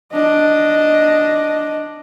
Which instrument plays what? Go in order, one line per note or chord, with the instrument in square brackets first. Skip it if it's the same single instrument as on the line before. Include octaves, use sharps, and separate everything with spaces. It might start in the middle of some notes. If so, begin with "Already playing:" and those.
[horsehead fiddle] D4 D#5